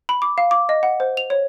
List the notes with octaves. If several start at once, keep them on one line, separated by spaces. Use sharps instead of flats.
B5
D6
F5
D6
D#5
F#5
C5
F7
C#5